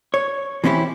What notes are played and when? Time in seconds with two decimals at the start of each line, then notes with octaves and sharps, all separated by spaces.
0.14 C#5
0.64 E3 C4 C#4 E4 G4